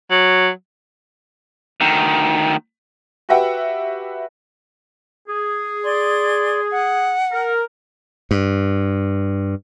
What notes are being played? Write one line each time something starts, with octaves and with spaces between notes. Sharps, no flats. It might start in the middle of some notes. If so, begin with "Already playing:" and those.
F#3
D2 D#3
F#4 G4 B4 E5 F#5 G5
G#4
D5 C6
F#5
A#4
G2